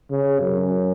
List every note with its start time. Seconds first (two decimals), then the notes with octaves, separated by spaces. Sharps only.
0.10 C#3
0.40 F#2